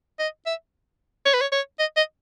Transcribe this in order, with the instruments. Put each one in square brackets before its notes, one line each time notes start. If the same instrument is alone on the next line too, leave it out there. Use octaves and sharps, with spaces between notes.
[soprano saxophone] D#5
E5
C#5
B4
C#5
C#5
D#5
D#5